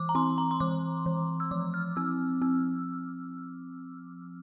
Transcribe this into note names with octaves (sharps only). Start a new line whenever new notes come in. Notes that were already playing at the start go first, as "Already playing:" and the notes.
Already playing: E3 D6
A#5
C4 C6
A#5
C6
E3 D6
E3
E6
F3 D6
F6
C4 E6
C4 E6